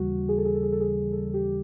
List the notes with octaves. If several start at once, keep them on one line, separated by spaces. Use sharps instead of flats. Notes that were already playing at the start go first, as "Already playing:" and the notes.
Already playing: D#2 C#3 E3 G3 F#4
G#4
A4
G#4
A4
G#4
A4
G#4
A4
G4